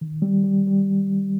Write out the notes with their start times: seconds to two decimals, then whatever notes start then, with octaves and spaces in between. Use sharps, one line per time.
0.01 D#3
0.22 G3
0.44 G3
0.67 G3